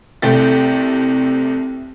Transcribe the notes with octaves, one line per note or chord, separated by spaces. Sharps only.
C2 C3 A3 G5 A6